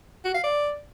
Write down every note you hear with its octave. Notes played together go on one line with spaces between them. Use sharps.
F#4
F5
D5